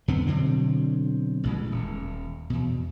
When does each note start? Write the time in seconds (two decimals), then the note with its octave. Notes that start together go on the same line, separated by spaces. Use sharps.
0.08 F2 D3 B3 C4
0.27 B2 D3 F#3 C4
1.43 A1 A#2 G#3
1.71 D#1
2.50 E2 B2